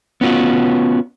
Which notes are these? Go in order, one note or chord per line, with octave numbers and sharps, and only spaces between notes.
B3 C#4 F4 F#4